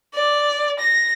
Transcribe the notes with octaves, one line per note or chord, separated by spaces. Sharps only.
D5
A#6